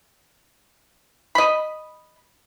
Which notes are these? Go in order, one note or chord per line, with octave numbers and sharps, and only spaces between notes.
D#5 B5